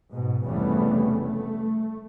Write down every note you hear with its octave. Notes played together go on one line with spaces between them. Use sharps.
G#2 B2
F1 C#3 E3 G3 A3 B3
A3